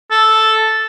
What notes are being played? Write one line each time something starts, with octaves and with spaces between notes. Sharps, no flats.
A4